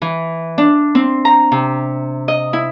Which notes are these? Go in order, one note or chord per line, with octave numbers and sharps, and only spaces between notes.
E3
D4
C4
A#5
C3
D#5
E4